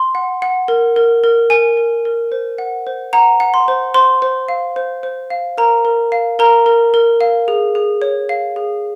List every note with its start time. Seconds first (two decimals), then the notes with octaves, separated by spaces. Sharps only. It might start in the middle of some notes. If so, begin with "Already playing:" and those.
Already playing: C6
0.15 F#5
0.42 F#5
0.68 A#4
0.96 A#4
1.24 A#4
1.50 A#4 G#5
1.77 A#4
2.05 A#4
2.32 C5
2.58 F#5
2.87 C5
3.13 F#5 A#5
3.40 F#5
3.54 C6
3.68 C5
3.94 C5 C6
4.22 C5
4.48 F5
4.76 C5
5.03 C5
5.30 F5
5.58 A#4 A#5
5.85 A#4
6.12 F5
6.39 A#4 A#5
6.66 A#4
6.94 A#4
7.21 F5
7.48 G#4
7.75 G#4
8.02 C#5
8.29 F5
8.56 G#4